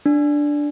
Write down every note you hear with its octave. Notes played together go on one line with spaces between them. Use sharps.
D4